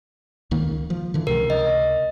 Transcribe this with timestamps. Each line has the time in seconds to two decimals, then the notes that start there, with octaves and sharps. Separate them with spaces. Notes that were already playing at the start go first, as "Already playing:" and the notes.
0.51 C#2 D#3 A#3
0.90 F3
1.14 D3 E3
1.27 C#2 C3 A#4
1.50 D#5